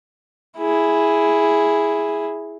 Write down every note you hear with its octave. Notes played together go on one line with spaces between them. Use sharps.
E4 G#4